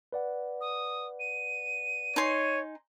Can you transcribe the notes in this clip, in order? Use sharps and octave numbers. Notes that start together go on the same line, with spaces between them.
B4 D5 F#5
D#6
D#7
D#4 C#5 G#5 C6